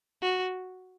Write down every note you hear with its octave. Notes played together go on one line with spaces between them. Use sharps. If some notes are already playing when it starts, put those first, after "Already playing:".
F#4